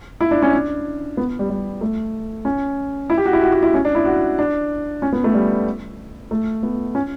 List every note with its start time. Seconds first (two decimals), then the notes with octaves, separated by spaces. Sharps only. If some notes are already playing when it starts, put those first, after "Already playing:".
0.21 E4
0.31 D4
0.42 C#4
0.53 D4
1.17 B3
1.39 G3
1.49 G3
1.81 A3
2.45 C#4
3.10 E4
3.18 G4
3.26 F#4
3.33 E4
3.42 F#4
3.52 F#4
3.63 E4
3.74 C#4
3.85 D4
3.95 E4
4.05 F#4
4.39 D4
5.02 C#4
5.13 B3
5.24 A3
5.34 G3
6.31 A3
6.63 B3
6.95 C#4